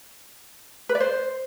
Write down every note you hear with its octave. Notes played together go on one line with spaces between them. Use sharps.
B4
D5
C5